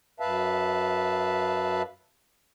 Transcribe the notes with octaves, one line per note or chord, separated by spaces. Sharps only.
F#2 B4 E5 F5 A5